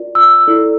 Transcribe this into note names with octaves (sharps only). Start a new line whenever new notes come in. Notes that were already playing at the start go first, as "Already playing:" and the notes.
Already playing: F4 A#4 D5
E6
E4 A4 D5